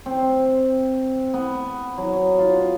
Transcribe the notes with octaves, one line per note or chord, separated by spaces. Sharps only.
C4
B3
F#3
F4